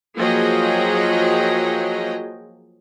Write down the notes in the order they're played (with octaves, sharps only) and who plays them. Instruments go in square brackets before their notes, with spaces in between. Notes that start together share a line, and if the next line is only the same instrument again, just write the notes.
[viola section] F3 F#3 A#3 G#4 D#5 G5